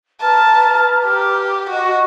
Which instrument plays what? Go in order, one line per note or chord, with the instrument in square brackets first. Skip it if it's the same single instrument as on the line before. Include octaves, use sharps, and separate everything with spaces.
[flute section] B4 A#5 F6 [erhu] A5
[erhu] G4
[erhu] F#4 [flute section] D#5